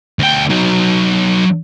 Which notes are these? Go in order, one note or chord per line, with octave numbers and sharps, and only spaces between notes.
D2 G5
F#3 D#4